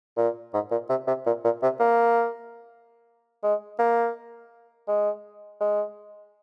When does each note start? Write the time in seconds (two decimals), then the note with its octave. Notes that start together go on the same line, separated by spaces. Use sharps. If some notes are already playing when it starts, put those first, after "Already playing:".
0.17 A#2
0.54 G#2
0.71 A#2
0.89 C3
1.07 C3
1.26 A#2
1.44 A#2
1.62 C3
1.80 A#3
3.43 G#3
3.79 A#3
4.88 G#3
5.61 G#3